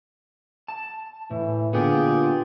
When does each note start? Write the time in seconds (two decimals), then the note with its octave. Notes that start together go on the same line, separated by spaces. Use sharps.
0.68 A5
1.31 A2 E3
1.73 A#2 D3 B3 D4 F4 G4 G#4